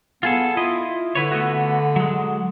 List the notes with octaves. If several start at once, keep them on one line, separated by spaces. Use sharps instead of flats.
B3 F4 G#4 A4
E4 F4 D#5
D3 E4 B4 C#5
A3 B3 F#4
F#3 G#3